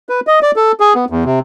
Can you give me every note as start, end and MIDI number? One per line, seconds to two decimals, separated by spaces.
0.09 0.20 71
0.27 0.39 75
0.42 0.51 74
0.56 0.72 69
0.80 0.94 68
0.95 1.05 59
1.10 1.24 40
1.25 1.39 48